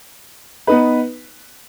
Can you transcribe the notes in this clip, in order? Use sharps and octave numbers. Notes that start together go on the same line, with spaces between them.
B3 D#4 B4